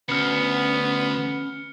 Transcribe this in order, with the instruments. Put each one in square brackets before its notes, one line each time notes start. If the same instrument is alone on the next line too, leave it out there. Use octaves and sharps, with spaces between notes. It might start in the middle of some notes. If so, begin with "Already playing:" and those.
[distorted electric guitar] D2 [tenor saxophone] B3 [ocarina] C#4 [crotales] F6 C#7